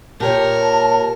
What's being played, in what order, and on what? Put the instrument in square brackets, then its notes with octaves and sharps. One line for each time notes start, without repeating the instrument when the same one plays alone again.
[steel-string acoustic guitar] A#2 G4 C#5 [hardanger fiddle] A#4 [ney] A5